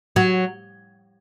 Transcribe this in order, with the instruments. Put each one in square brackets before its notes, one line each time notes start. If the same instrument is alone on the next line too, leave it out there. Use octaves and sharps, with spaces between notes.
[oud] F#3